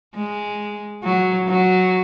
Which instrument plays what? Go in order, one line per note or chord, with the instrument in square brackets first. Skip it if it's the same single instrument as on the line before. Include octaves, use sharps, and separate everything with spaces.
[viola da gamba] G#3
F#3
F#3